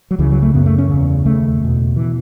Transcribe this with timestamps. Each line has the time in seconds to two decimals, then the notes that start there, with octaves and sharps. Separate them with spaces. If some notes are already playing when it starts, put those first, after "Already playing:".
0.11 F#3
0.19 C#2 C#3 E3
0.31 F#3
0.42 A3
0.54 F#2 C#3 B3
0.66 A3
0.78 C#4
0.90 E2 C#3
1.25 D#2 C#3 A3
1.60 E2 B2
1.96 B2 E3